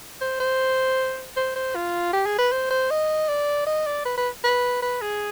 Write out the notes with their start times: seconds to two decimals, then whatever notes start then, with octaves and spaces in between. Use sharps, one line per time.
0.21 C5
0.40 C5
1.36 C5
1.56 C5
1.75 F4
2.13 G4
2.26 G#4
2.38 B4
2.52 C5
2.70 C5
2.91 D#5
3.28 D5
3.67 D#5
3.86 D5
4.05 B4
4.18 B4
4.44 B4
4.82 B4
5.01 G#4